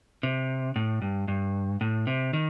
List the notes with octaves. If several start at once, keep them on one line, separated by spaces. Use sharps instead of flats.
C3
A2
G2
G2
A2
C3
D#3